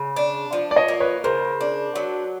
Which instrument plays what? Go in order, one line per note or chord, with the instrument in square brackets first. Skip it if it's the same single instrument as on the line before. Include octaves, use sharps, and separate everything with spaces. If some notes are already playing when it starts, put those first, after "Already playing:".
Already playing: [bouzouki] C#3
D4
F3
[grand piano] D5
C#5 D#5
[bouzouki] A#3
[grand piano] B4 C#5
[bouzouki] C#3 [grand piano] A#4 C5
[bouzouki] D4
F#3